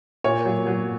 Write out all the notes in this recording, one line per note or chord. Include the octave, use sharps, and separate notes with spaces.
A#2 C#5
F#3
F#3